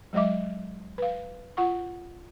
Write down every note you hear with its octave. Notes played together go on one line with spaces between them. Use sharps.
F#3 G#3 D#5 E5 D6
B4 F5
F4 F#5 C#6